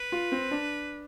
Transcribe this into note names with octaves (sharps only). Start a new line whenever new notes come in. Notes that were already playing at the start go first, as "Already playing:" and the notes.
Already playing: B4
F4
C4
D4